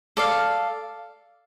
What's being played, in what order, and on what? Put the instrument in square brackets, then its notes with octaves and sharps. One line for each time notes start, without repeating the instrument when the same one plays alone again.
[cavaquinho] A4 D5 F5